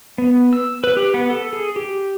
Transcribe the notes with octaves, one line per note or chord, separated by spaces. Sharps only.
B3
E6
B4
G4
B3
A4
G#4
G4